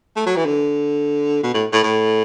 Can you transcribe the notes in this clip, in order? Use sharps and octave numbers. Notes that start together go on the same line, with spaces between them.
A3
F#3
E3
D3
B2
A2
A2
A2